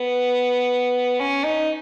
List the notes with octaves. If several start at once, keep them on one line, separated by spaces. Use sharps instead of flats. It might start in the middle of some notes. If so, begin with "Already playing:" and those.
Already playing: B3
C#4
D#4